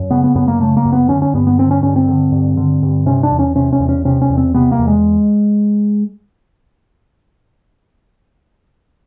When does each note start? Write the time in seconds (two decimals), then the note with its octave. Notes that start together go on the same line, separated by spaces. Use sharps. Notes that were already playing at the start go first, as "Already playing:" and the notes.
Already playing: F#2
0.11 C#3 B3
0.24 B3
0.35 F#2 B3
0.48 A#3
0.60 C#3 A3
0.77 A#3
0.85 F#2
0.92 B3
1.09 D3 C#4
1.22 C#4
1.34 G2 B3
1.47 B3
1.59 D3 C4
1.71 C#4
1.83 G2 C#4
1.96 C4
2.08 D3
2.32 G2
2.57 D3
2.83 G2
3.06 C3 C#4
3.23 D4
3.32 E2
3.39 C#4
3.56 C3 C#4
3.73 C#4
3.80 E2
3.89 C#4
4.05 C3 C#4
4.22 C#4
4.30 E2
4.38 C4
4.54 C3 B3
4.72 A#3
4.79 E2
4.88 G#3